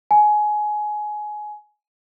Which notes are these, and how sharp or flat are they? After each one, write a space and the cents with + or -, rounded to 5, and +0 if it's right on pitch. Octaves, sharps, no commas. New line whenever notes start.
G#5 +20